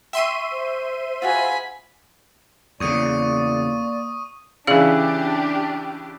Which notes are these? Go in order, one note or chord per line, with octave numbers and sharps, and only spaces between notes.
E5 G5 C6 C#6 D#7
C5
F4 F#4 G#4 G#5 B5
E2 C#3 A#3 D5 C#6 D#6 D#7
C#3 E3 D4 G4 G#4 D5 F5